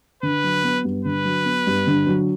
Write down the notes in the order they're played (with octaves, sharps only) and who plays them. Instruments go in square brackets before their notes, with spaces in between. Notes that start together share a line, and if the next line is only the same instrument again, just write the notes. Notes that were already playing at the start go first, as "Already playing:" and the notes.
[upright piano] D3 [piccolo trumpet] B4
[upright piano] F#3
B3
G2
[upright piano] D3 [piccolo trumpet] B4
[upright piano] F#3
B3
G2
D3
F#3